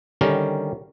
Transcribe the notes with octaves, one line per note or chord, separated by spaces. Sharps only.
D3 D#3 G3 C#4 G4 A#4